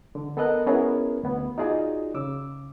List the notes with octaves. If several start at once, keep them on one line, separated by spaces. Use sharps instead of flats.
D3
B3 A4 A#4 D#5 F#6
B3 C#4 E4 G#4 A#4
D2 B3
D#4 F4 F#4 G#4 D5
C#3 D6 E6